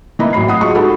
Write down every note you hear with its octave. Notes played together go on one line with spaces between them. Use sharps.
E3 A#3 D#5 E5 A#5 B5
A1 F#3 B5 C7
F#5 D#6
G#3 F4 F#4 D#5 C#6
D#4 F#4 G4 A4 F#5 B5